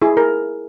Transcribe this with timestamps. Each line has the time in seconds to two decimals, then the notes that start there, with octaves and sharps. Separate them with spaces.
0.02 E4 G#4
0.17 A#4